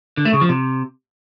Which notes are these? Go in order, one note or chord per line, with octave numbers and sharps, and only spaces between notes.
D3
A3
C#3
F3
C3